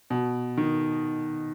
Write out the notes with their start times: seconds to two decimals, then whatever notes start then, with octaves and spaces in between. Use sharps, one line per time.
0.10 B2
0.57 D#3